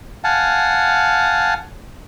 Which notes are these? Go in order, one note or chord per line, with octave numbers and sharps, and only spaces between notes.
F5 F#5 G#5 A5